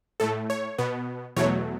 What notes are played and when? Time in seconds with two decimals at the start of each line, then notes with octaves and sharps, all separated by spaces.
0.20 A2 A3 A4
0.50 C#5
0.78 B2 B3
1.36 E2 B2 F#3 A3 C#5